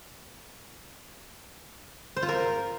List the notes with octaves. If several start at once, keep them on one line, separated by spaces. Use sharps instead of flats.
C5
F4
A#4